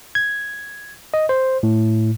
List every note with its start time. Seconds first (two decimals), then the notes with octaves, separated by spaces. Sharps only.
0.15 G#6
1.14 D#5
1.29 C5
1.63 A2